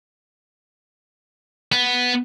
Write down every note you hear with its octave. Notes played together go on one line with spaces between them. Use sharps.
B3